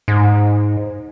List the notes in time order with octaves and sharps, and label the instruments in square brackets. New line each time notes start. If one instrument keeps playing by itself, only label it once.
[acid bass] G#2